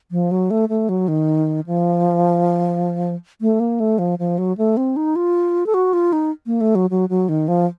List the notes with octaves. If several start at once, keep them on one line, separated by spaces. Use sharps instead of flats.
F3
F#3
A3
A3
F#3
D#3
F3
A3
A#3
A3
F3
F3
F#3
A3
C4
D#4
F4
A4
F#4
F4
D#4
A#3
A3
F#3
F#3
F#3
D#3
F3